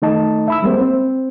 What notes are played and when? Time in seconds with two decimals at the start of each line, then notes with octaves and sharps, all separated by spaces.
0.02 D#3 A3 D#4 D#5 A5
0.48 E5 B5 E6
0.63 G3 G#3 A#3 C4 C5
0.81 C4